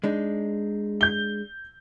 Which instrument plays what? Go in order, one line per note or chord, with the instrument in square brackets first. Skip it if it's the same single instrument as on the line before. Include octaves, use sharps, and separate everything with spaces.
[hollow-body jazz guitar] G#3 D4 D#4
[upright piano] G6 G7